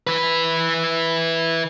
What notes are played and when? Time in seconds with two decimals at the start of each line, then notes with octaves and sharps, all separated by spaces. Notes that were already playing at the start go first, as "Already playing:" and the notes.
0.07 E3 B4